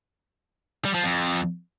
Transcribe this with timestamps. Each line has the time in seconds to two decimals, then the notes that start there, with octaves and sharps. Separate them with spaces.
0.85 G3
0.94 F3
1.04 F2